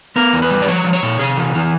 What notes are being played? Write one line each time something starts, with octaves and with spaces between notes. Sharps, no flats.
B3 A#4
E2
B4
G3
D5
F3 C#5
F3
C#5
A#2
C3 G#4
E3
E3